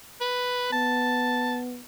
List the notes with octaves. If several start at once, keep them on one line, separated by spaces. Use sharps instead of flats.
B4
B3 A5